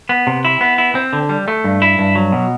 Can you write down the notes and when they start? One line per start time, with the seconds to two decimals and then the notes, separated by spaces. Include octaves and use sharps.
0.09 B3
0.27 C3
0.45 E4
0.61 B3
0.78 E4
0.95 C4
1.13 D3
1.29 G3
1.48 A3
1.64 G2
1.82 E4
1.99 G2
2.15 F#3
2.32 B2